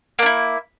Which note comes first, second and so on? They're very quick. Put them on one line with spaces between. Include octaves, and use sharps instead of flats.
A#3 D4 E4